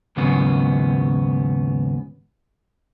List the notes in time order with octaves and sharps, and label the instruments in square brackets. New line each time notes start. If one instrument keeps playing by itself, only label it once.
[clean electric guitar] D#2 G#2 C#3 F#3 B3